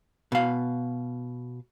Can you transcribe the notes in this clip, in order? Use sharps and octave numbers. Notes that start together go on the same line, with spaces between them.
B2 F5